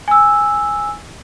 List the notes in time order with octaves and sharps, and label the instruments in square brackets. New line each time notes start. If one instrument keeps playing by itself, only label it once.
[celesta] G#5 E6